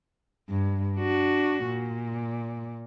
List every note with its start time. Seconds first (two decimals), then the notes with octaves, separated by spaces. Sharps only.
0.50 G2
0.97 D4 F#4
1.66 A#2